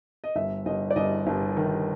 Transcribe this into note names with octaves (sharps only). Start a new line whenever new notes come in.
D#5
G1 E5
G1 D#5
D5
G1 D#5
G1
D#3